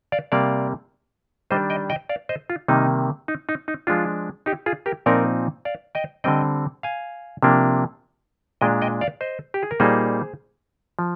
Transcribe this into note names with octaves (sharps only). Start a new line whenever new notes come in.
D5 F5
C3 G3 A#3 D5 F5
D#3 G3 D4 C5 D#5
D#5 G5
D#5 G5
D5 F5
C5 D#5
F4
C3 D#3 G3 A#3 D#4
D#4
D#4
D#4
F3 G#3 D4 F4
D#4 G4
F4 G#4
G4 A#4
A#2 F3 C4 D#4 A#4 D5
D5 F5
D#5 G5
D3 G3 C4 D#5 G5
F5 G#5
C3 F3 A#3 D4
A#2 G#3 D4 D#5 G5
D#5 G5
D5 F5
C5 D#5
G4
G#4
A#4
A#2 G3 A#3 D#4 G#4 C5
F3